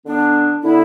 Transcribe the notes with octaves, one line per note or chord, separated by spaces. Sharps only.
D3 B3 D4
D3 B3 E4